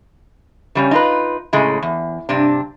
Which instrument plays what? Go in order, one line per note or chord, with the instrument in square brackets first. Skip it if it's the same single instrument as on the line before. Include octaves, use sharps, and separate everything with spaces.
[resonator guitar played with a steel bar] C#3 G3 C#4
D#4 F4 B4
A2 C#3 G#3
E2
G2 C3 D4